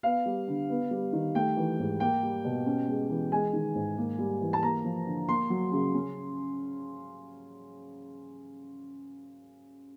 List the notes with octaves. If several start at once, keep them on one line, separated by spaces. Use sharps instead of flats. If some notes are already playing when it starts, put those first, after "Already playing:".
B3 F5
G3
D3
B3
G3
D#3
A3 G5
E3
G#2
A#3 G5
G3
B2
C#4
G#3
E3
G#3 G#5
D#3
G#2
A#3
G3
E3
A5
A#3 A#5
F3
D3
A#3 C6
F#3
C#3
C#4